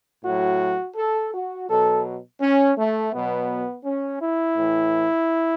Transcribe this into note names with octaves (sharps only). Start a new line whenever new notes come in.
A2 F#3 F#4
A4
F#4
B2 F#3 A4
C#4
A3
B2 F#3 B3
C#4
E4
A2 E3